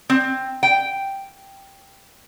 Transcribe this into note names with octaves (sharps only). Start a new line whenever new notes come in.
C4
G5